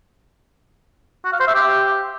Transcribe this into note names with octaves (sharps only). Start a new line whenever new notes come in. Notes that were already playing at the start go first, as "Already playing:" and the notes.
F#4
F5
C5
E5
G4